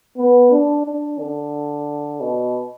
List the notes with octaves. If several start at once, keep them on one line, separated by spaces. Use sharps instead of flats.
B3
D4
D4
D3
B2